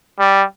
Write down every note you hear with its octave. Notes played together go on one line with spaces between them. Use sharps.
G3